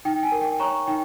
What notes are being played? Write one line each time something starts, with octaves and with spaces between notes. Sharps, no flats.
D#4 G5
G#5
A#4
G5
C#5 A#5 C#6
D#4 G5